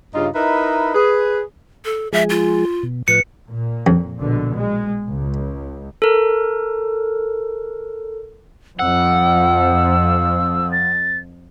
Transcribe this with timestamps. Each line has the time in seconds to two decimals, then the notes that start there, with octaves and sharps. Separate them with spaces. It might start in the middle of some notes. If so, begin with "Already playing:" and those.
0.14 G2 C#3 D#4 F4
0.35 D#4 E4 A#4 B4 D#5 E5
0.94 G#4 B4
1.85 A4
2.13 F3 G#3 G#4 E5
2.30 F4
2.83 B2
3.08 A2 F3 B4 C#7
3.48 A#2
3.87 F2
4.20 A#1 B2 D3
4.58 G#3
5.08 C#2
6.02 A4 A#4
8.79 F2 F3 F#5 E6
10.72 A6